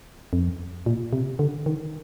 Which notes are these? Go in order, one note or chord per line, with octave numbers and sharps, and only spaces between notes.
F2
A#2
C3
D3
D#3